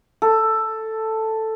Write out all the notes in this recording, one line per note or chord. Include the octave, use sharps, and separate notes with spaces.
A4